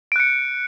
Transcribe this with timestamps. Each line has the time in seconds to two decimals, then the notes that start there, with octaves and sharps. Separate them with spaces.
0.12 D7
0.16 F#6
0.20 C#7